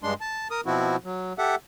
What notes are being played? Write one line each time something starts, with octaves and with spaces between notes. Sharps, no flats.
G2 G#3 D4 C6
A5
A#4 D#6
B2 F3 C4 E4 F#4
F#3
G4 A4 E5 F#5